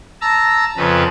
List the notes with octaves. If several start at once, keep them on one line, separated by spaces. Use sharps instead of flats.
A5 A#5 E6
F2 C#3 B4